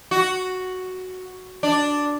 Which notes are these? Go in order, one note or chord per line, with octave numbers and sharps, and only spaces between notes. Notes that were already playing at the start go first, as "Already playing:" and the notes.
F#4
D4